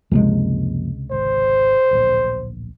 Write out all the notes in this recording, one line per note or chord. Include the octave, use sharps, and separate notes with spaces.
C#2 F#2 C3 F3 G#3 A#3
G#1 C5
D1 A#1